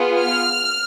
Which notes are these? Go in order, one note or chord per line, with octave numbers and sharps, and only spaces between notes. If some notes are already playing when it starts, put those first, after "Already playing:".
Already playing: B3 F4 G#4
F6